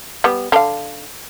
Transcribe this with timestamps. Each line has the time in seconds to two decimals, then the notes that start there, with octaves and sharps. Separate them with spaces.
0.24 G3 B3
0.52 D3 F5